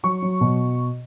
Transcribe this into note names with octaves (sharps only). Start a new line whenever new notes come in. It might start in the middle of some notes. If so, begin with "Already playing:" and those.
F#3 C#6
F#3
B2